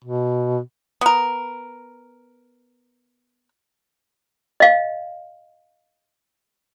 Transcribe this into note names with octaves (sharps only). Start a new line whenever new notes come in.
B2
B3 A#4
D#5 F5